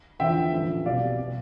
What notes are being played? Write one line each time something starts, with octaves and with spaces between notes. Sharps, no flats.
E2 D3 F3 E5 G5
A1 G2 F3 A3
C2 B2 G3 D5 F5
B2